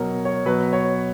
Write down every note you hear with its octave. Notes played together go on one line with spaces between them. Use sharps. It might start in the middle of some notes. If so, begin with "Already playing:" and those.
Already playing: B2 F#3 A#4 C#5
C#5
B2 F#3 B4
C#5